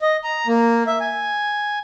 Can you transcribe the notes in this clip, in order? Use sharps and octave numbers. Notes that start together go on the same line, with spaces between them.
D#5
A#5
A#3
E5
G#5